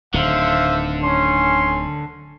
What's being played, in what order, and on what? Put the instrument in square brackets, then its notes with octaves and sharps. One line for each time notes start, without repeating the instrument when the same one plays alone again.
[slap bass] D1 D#3 [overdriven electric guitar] D3 [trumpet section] C5 E5 F5
[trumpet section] C#4 [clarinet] C6